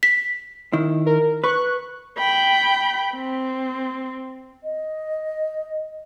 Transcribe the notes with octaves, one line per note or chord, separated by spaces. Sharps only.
B6
D#3 E4
A#4
B4 C#6 F#6
G5 B5
C4
D#5